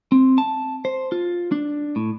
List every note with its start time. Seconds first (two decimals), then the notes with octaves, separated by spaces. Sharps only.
0.12 C4
0.38 A5
0.85 C5
1.12 F4
1.52 D4
1.96 A2